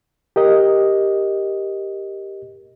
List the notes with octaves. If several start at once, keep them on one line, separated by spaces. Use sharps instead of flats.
G4 A#4 D#5